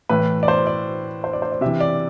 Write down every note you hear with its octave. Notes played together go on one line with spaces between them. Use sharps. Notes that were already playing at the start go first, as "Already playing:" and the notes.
A2 E3 B4
D5
C5
D5
C5
D5
C5
D5
C3 E3 E5
D5